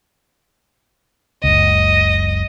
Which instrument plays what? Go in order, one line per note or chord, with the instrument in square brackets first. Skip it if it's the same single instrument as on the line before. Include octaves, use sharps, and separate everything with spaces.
[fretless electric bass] F#1 C#2 [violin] D#5